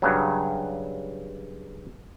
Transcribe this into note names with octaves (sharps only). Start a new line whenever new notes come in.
G2 C#3 F#3